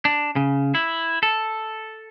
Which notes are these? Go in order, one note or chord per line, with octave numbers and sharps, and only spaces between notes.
D4
C#3
E4
A4